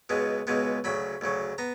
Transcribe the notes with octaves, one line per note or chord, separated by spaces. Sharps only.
C#2 B2 G#3 B3
C#2 B2 G#3 B3
D2 C#3 F#3 B5
D2 C#3 F#3
B3 A#5